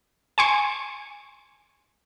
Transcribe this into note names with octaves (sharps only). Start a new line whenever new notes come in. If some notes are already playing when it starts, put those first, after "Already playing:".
G#5 C6 C#6